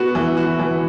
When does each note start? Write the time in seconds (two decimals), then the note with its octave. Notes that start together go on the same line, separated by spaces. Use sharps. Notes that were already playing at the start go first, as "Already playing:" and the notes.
Already playing: B3 F#4
0.15 E3
0.37 F#4
0.60 E3